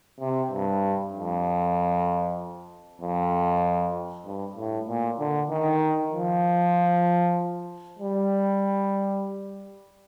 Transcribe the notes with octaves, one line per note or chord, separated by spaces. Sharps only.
C3
G2
F2
F2
G2
A2
A#2
D3
D#3
F3
G3